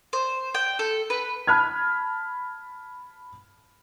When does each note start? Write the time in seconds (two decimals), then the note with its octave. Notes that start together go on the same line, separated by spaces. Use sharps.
0.13 C5
0.55 G5
0.79 A4
1.10 B4
1.47 A5 B5 F6 G#6